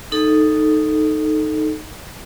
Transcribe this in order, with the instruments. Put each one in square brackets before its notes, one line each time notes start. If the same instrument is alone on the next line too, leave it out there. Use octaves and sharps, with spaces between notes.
[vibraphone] D#4 A4